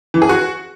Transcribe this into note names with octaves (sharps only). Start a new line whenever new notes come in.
E3
G#4
F#4